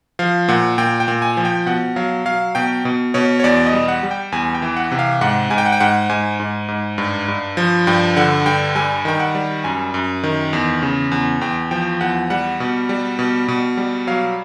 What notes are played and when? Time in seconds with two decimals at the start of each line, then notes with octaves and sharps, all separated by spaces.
0.19 F3 F5
0.48 A#2 F#5
0.78 A#2 G5
1.00 G5
1.08 A#2
1.22 G#5
1.37 F3
1.45 G5
1.66 B2 F#5
1.96 F#3 F5
2.25 F#3 F5
2.55 B2 G5
2.85 B2
3.14 B2 C#5
3.40 C#5
3.44 E2 D5
3.66 D#5
3.73 G3
3.88 F#5
4.03 G3
4.11 G5
4.32 E2 G#5
4.55 G5
4.62 E3
4.77 F#5
4.91 C3
4.99 F5
5.21 G#2 F#5
5.50 G#2 G#5
5.58 G5
5.66 F#5
5.72 G5
5.80 G#2 F#5
6.10 G#2 G#5
6.40 G#2
6.68 G#2
6.98 G2
7.28 G2
7.57 F3
7.87 G2 G5
8.16 D3 F#5
8.46 G2 G5
8.75 G3 G#5
9.05 D#3 G5
9.20 F#5
9.35 G3
9.64 F#2 G#5
9.94 F#2
10.23 D#3
10.53 E2
10.82 C#3
11.12 E2
11.41 E2 G5
11.71 F3 G5
12.01 E2 F#5
12.30 G3 F#5
12.60 B2
12.89 G3
13.19 B2
13.48 B2
13.77 G3
14.07 F#3 F5